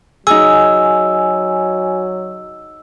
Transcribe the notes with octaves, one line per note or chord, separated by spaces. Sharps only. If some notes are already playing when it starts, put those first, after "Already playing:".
F#3 D#4 G#4 G#5 E6